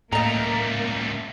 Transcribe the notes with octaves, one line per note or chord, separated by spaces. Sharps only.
C#2 A2 A3 A#3 D#5 A#5